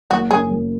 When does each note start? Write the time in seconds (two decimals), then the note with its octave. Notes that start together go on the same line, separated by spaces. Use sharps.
0.11 F#1 F#4
0.31 F#2 C#3 G#4
0.50 F#1